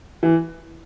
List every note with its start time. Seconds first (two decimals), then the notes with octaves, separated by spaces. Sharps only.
0.23 E3